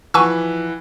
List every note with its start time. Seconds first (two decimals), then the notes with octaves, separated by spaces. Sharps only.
0.14 E3 F3 B4 F#5 G#5 C#6 E6